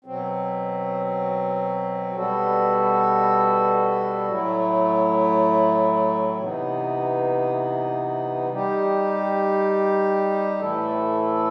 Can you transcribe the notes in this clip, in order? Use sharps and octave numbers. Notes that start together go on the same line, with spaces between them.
B2 F#3 C4
B2 G3 B3 F#4 A4
A2 F#3 A3 E4
C3 E3 B3 D#4
G3 D#4 G4
A2 E3 A3 E4 A4